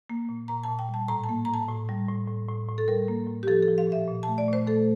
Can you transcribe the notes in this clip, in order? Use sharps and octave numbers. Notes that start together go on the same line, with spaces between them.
A#3
A#2
A#2 A#5
A5
A#2
G5
G3 A5
A2 A#5
A5
A#3
A#5
A2
A5
A2
G3
A2
A2
A2
A2
A4
G3 A#4
A#3
A2
G4
F3 A4
A4
F3
F5
A#2
E5
A#2
A5
A3
D5
A#2 C5
A3 A4